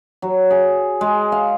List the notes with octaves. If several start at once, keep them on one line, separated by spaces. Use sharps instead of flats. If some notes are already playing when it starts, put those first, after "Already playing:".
F#3
G#4
G#3
F5